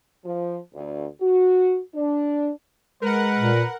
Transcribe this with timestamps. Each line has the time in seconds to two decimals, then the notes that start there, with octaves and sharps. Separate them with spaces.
0.24 F3
0.74 D2
1.21 F#4
1.95 D4
3.02 G#3 A#4 B4 F#5
3.37 A#2